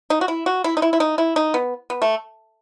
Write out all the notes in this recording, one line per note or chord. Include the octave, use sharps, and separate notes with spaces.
D#4
F#4
E4
F#4
E4
D#4
E4
E4
D#4
E4
D#4
B3
B3
A3